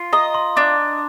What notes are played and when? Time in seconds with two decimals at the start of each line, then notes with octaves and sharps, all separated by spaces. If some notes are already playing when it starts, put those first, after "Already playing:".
Already playing: F4
0.13 D#5 A#5
0.35 C6
0.56 D4 D6